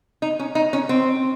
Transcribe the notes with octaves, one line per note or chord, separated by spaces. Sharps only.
D#4
C#4
D#4
C#4
C4